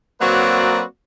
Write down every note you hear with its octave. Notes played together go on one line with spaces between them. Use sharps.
F#3 A#3 C4 F#4 B4 D5